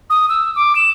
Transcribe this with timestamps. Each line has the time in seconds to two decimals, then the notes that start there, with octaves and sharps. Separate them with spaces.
0.10 D#6
0.29 E6
0.56 D6
0.76 E7